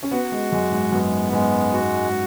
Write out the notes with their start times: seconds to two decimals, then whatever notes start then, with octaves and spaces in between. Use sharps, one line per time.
0.03 C#4
0.11 B3 F#4
0.32 G#3
0.52 F#2 G#3
0.72 G#2
0.92 F#2 B3
1.32 G#2 G#3
1.73 F#4